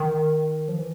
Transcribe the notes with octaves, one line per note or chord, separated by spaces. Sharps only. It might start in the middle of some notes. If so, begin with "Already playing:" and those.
Already playing: D#3
F3
E3